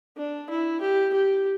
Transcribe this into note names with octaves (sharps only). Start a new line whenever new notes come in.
D4
E4
G4
G4